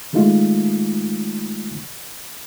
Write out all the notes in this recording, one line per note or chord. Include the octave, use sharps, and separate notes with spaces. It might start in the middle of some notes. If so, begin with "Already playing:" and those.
D#3 G#3 A3 D#4 F4